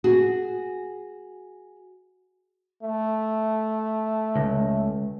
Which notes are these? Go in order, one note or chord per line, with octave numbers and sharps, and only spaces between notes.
F#4 G#4
A3
C#2